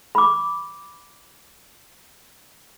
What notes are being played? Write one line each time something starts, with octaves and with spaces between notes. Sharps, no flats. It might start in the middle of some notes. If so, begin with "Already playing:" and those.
B5 D6